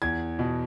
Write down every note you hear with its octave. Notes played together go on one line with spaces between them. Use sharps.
E2 G#6
B2